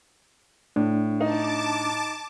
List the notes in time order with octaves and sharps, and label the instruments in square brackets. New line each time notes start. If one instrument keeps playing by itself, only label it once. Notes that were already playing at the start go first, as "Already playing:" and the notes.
[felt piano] A2 [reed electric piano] D4
[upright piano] D#4 [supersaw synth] A5 D6